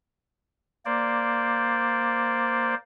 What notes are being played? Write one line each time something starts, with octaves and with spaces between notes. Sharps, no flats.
A#3 C5 D5